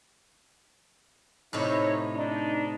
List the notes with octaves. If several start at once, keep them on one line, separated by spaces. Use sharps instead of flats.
A2 C3 D#4 C#5
D4 D#4